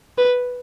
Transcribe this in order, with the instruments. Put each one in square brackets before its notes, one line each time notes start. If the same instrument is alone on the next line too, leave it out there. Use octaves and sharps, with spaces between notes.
[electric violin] B4